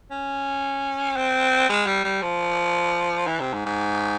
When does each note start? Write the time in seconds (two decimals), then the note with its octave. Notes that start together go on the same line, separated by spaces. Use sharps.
0.11 C#4
1.16 C4
1.69 G#3
1.86 G3
2.04 G3
2.22 F3
3.27 E3
3.40 C3
3.53 G#2
3.66 G#2